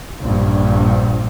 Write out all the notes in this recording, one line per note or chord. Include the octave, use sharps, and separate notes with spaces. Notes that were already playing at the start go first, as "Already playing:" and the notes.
A#1 G2